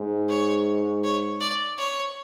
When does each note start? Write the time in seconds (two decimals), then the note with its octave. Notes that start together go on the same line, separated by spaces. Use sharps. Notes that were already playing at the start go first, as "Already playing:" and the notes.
Already playing: G#2
0.29 C#5
1.04 C#5
1.41 D5
1.78 C#5